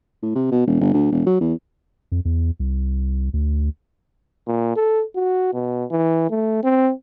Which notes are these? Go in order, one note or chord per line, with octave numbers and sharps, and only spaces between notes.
A2
C3
B2
E1
G1
D2
E1
F#3
E2
F2
E2
C2
D2
A#2
A4
F#4
B2
E3
A3
C4